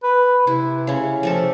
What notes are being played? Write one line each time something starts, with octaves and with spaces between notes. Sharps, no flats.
B4
C3 E4
C#3 C#4
F3 A3 G4 A4